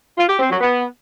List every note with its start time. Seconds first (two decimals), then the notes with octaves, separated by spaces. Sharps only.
0.18 F4
0.29 G4
0.40 C4
0.50 F#3
0.61 B3